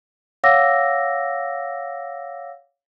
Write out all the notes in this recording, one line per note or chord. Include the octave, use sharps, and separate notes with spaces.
C#5 F5 F#5 D6 E6 A#6